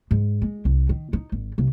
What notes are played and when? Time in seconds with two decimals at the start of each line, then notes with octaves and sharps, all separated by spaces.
0.11 G#2
0.42 G#3
0.65 C2
0.89 D#3
1.13 D#4
1.32 G#1
1.58 C2